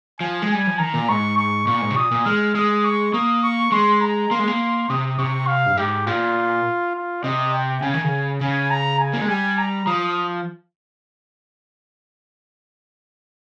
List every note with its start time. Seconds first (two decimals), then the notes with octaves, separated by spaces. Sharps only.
0.20 F3 G#5
0.42 G#3
0.50 G3 G#5
0.67 F3
0.79 D#3 A#5
0.94 A#2
1.09 G#2 C#6
1.37 C#6
1.67 A#2 C#6
1.82 G#2
1.90 C3
1.96 A#2 D#6
2.11 A#2
2.26 G#3 F6
2.55 G#3 D#6
2.85 C#6
3.14 A#3 D#6
3.43 C#6
3.72 G#3 C6
4.01 A#5
4.31 A#3 C6
4.39 G#3
4.48 A#3
4.90 C3 D#6
5.19 C3 C#6
5.48 F5
5.66 G2
5.77 G#2 G4
6.07 A#2 F4
6.95 F4
7.24 C3 D#5
7.54 G5
7.82 C#3 G#5
7.94 D#3
8.04 C#3
8.41 C#3 G#5
8.71 A#5
9.00 G#5
9.13 A#3
9.21 G#3
9.28 G3 G#5
9.59 A#5
9.87 F3 D#6